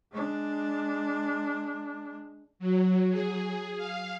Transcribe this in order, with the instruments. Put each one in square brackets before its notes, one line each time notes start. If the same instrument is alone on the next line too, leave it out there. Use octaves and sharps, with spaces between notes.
[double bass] G#3 D4
[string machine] F#3
G#4
F5